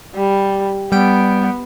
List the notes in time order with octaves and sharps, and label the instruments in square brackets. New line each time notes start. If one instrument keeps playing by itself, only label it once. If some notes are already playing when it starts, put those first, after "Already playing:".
[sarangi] G3
[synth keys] G3 G5 D7 [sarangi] B3